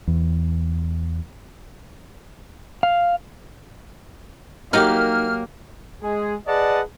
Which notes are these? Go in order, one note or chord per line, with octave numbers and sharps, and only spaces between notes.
E2
F5
F#3 A#3 D#4 F#4 G4 A#4 F6
G#3 G#4
G#4 B4 D5 D#5 F#5 A5